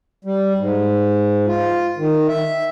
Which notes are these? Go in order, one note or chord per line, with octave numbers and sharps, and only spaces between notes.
G3
G#2
F4
D#3
E5